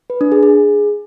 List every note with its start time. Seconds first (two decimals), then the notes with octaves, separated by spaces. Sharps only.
0.10 B4
0.21 D4
0.32 G#4
0.43 G#4